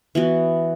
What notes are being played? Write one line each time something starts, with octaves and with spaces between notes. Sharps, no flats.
E3 B3 F#4